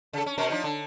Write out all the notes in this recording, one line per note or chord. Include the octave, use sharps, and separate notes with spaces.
C#3 A4
C#4
B2 C#4 A#4
F3 D4 D#4
D3